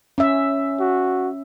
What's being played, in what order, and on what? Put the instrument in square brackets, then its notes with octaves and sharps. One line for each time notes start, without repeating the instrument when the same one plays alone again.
[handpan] C#4 E5
[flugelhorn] F#4